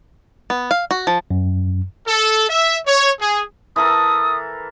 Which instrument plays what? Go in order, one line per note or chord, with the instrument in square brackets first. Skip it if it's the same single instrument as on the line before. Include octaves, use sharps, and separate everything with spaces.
[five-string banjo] B3
F5
F#4
F3
[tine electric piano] F#2
[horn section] A4
E5
C#5
G#4
[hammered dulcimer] E3 A4 A#4 [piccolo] D#6